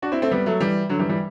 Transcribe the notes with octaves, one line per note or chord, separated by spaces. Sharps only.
D4 F#4
C4 E4
A3 C4
G3 B3
F#3 A3
E3 G3
D3 F#3
E3 G3
E3 G3